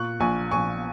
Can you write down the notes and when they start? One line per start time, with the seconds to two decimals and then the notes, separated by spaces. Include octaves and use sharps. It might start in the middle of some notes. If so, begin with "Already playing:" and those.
Already playing: A#2 C#6 F#6
0.20 A#1 G#5 C#6
0.51 A#1 G#5 C#6